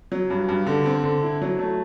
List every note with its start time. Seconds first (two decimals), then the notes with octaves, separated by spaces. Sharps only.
0.12 F#3
0.30 G2
0.49 G2
0.66 D3
0.86 C4
1.04 D3
1.23 E4
1.41 F#3
1.59 A3